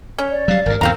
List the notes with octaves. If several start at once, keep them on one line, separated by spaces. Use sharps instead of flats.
C#4 C#5
D5
F#3 G3 F5
G#1 G2 A#4
E2 G#2 C#3 C4 F5 A#5